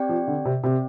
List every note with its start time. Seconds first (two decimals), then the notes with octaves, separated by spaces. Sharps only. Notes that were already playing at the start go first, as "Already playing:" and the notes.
Already playing: C4 G4 D5 G5
0.09 F3
0.27 D3
0.45 C3
0.63 C3 C4 G4 D5 G5